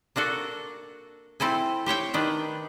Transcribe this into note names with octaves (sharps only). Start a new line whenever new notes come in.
A#3 D4 F#4 A4
C4 E4 A4 G#5
G4 C5 C#5 G5
D#3 D4 B4